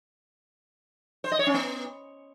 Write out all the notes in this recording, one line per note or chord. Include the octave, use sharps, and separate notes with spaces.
C5
D#5
C#5
C#4
B3